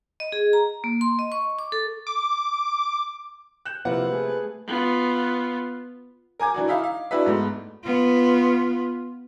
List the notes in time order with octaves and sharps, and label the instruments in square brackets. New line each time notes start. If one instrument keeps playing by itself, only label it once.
[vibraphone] D#5
G#4
A#5
A#3
C6
D#5
C#6
D6
A4
[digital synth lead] D6
[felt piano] F#6 G6 E7
[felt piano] C3 A#3 [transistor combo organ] F3 E4 F4 [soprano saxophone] B4 [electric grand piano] F#5
[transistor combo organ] A3 G#4
[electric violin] B3 F4
[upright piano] A#4 G#5 D6 G#6
E3 D4 F#4
D#4 E4 E5 F5
F5
D4 E4 F#4 B4 E5
G#2 A3 B3
[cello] B3 F4